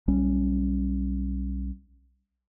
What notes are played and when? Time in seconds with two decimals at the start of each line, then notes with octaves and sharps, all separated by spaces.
0.08 B1 G3 C#4